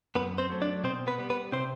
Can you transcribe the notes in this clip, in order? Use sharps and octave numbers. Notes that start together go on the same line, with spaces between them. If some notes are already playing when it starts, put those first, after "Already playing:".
F#2 B3 B4
C4 C5
F#3 A3
D4 D5
B2 C4 C5
B3 B4
G3 B3
B3 B4
C3 C4 C5